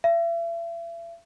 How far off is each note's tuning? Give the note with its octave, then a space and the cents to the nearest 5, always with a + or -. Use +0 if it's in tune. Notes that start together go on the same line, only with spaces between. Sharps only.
E5 +40